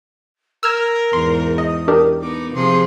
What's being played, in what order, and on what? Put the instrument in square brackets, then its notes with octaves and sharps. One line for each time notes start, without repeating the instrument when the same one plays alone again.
[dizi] A#4 [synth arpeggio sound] E6 F6 G#6
[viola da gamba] E2 G#2 [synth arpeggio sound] C6
[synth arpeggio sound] D#5 [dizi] D#6
[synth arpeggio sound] D4 G4 A#4
[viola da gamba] B3 D#4 [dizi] D6
[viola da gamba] C3 F3 G#4 [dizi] C6